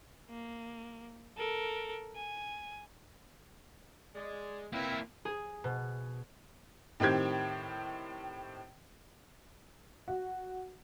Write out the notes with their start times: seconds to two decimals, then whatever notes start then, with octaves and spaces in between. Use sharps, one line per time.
0.30 A#3
1.37 A4 A#4
2.16 G#5
4.15 G#3 D5
4.72 A#3 C4 E4 B4 E5
5.25 G#4
5.64 B2
7.00 A2 D#3 C4 G4 G#6
10.08 F#4